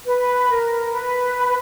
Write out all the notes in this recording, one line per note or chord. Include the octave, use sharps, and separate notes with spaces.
B4
A#4
B4